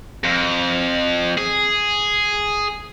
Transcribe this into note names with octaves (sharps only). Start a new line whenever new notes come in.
F2
G#4